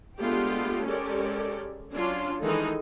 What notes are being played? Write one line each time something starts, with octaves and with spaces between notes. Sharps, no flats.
G#3 A3 B3 D4 F4 G4
G#3 C#4 G4 A4 A#4 D5
F#3 C#4 D4 F4
D#3 E3 G#3 A3 D#4 A4